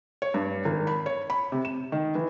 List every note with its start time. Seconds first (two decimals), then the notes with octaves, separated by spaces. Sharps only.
0.22 C#5
0.34 G2
0.65 G#1
0.87 B5
1.06 C#5
1.30 B5
1.52 C3
1.65 E7
1.92 D#3
2.15 E3